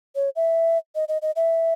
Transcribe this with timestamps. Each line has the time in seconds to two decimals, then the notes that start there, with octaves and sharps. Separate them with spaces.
0.15 C#5
0.36 E5
0.95 D#5
1.08 D#5
1.22 D#5
1.36 E5